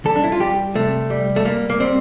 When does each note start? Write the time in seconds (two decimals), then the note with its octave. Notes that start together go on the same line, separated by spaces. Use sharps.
0.05 G3 A4
0.16 D4
0.24 E4
0.32 F4
0.40 G3 G4
0.75 C3 A3
1.10 G3
1.36 A3
1.45 G3 A#3
1.70 A#3
1.80 G3 C4